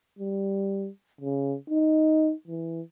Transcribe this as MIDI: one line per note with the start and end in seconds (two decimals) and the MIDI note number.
0.18 0.88 55
1.21 1.56 49
1.70 2.33 63
2.47 2.81 52